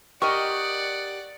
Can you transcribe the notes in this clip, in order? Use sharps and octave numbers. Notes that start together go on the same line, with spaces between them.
G4 A#4 D5 D#5 F#5 C#6